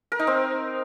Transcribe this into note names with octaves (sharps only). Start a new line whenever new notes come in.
A#4
D#4
C4